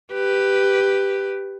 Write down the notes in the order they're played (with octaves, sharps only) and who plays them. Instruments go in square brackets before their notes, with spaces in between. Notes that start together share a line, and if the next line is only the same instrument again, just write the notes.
[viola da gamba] G4 B4